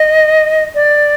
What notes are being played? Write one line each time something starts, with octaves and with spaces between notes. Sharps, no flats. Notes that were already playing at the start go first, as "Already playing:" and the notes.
Already playing: D#5
D5